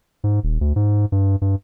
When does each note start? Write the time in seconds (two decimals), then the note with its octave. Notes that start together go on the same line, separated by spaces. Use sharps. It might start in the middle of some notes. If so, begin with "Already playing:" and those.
0.24 G#2
0.43 D#1
0.61 D2
0.76 G#2
1.12 G2
1.42 G2